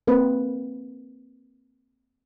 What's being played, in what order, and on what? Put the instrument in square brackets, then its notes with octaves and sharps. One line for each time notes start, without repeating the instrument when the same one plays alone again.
[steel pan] A#3 C4 B4